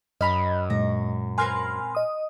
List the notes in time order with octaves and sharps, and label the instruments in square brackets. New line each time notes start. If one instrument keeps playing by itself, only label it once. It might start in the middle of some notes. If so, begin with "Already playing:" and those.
[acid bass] F#2 [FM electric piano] D#5 [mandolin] A#5 B5 F6
[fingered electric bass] A#2 G#3 [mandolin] A#5
[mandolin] C4 A#4 B4 [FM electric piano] G#5 C6 F6
[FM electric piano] D#5 D#6